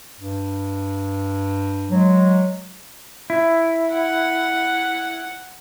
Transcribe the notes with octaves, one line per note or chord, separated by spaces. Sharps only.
G2
F#3 G#3
E4
F#5